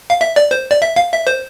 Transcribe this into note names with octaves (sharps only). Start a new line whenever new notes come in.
F5
E5
D5
C5
D5
E5
F5
E5
C5